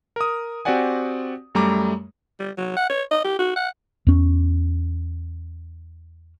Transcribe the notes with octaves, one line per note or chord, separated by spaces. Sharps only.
A#4 D#6
C4 F#4 G4 D5 F#5 G#5
F#2 G3 A3 A#5 D6
G3
F#3
F#5
C#5
D#5
G4
F#4
F#5
E2 C#4